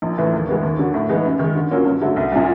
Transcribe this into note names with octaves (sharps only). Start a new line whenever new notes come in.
A#1
A2 E3
D#2
D#3 G#3 B3
D#2
D3 F#3
A2
E3 G#3 B3 D#4
F#2
D#3 G#3
D3
F#3 A#3 C#4 F4
G2
D3 F#3 A3
C2
A#2 G3